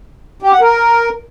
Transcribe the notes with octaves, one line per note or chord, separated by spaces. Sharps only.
G4
F#5
A#4